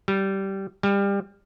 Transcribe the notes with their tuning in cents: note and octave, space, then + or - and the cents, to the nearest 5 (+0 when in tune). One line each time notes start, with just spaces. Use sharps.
G3 -15
G3 +25